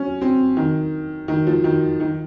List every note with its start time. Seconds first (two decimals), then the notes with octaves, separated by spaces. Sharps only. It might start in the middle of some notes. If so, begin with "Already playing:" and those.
Already playing: C#4
0.21 C4
0.57 D#3
1.28 D#3
1.47 F3
1.64 D#3
2.00 D#3